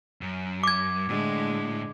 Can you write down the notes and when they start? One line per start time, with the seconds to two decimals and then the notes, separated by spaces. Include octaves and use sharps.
0.21 F#2
0.63 D6 G#6
1.09 A2 D3 G#3